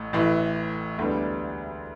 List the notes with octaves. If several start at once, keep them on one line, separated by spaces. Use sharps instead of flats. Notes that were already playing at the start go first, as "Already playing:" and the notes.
Already playing: A1 A2
A1 A2 E3
E1 D2 D3 G3 B3